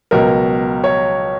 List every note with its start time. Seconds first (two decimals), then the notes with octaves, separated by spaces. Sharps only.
0.11 C#2 B2 F#3 A#4
0.84 C#5